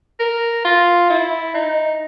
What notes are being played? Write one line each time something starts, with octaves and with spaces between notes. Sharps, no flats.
A#4
F4
E4
D#4